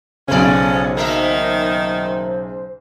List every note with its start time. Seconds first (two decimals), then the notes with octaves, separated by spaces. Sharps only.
0.28 B1 F2 C#3 B3 C#4 C5 D5
0.97 D#3 A#3 A#4 E5